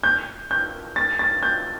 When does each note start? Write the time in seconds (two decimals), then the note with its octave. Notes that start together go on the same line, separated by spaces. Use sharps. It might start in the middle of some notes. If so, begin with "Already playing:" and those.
0.03 G6
0.51 G6
0.96 A6
1.19 A6
1.43 G6